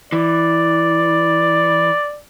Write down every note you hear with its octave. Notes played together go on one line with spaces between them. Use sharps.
E3 D5